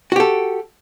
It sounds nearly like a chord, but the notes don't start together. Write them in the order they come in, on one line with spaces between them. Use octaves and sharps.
F#4 G4 A4